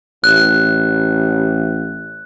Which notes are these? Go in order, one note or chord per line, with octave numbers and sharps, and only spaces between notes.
A1 F#6